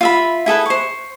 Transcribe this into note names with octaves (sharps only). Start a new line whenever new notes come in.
F4 E5 B5
E4 G#4 A4 B4
C5 C#6